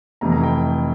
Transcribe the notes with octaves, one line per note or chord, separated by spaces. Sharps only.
F1 F2 E3 A#5
A#5
G5